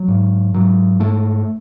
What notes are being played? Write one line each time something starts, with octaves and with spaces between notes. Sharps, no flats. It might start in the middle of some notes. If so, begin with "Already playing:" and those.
Already playing: F#3
G#2
G#2 F#3
G#2 A3